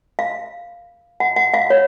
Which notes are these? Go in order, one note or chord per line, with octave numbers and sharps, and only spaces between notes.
F5
F#5
F#5
F5
C#5